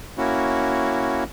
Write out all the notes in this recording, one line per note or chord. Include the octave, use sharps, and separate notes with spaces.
A#3 C#4 E4 F#4